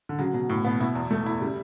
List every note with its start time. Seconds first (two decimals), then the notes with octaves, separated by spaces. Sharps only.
0.09 D3
0.18 C#3 F#3
0.33 B2 F#3
0.50 A2
0.65 B2 B3
0.80 B2 E4
0.95 E2
1.11 A3
1.26 E4
1.41 C#3 G3